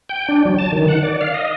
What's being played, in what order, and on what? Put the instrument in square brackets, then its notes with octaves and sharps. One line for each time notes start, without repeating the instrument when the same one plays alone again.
[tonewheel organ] G5
D4
F#3
A5
D#3
F#5
D5
F5
D#5